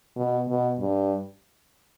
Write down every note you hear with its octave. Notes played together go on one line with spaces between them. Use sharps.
B2
B2
G2